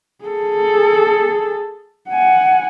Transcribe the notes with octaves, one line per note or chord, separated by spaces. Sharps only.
G#4 A4
F#5 G#5